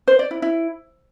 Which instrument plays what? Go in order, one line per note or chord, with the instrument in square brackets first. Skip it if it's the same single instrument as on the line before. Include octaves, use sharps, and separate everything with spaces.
[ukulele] C5
D5
E4
E4